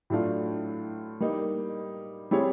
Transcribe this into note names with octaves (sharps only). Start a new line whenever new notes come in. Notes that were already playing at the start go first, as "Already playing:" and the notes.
A2 F#3 A3 D4 F4
G3 A#3 D#4
G3 C4 E4 G#4 C#5